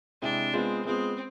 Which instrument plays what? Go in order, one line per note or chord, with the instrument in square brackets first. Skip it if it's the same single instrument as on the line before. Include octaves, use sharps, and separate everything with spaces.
[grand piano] C3 G#3 C4 E4 [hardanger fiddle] D4
[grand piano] G#3 B3 F4 G#4 [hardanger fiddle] C4
[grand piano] G#3 B3 F4 G#4 [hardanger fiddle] C4